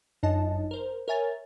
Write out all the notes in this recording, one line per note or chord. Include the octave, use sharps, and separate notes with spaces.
G1 F#2 D#4 D#5 A5
A#4 C5
A#4 C#5 E5 G#5 A6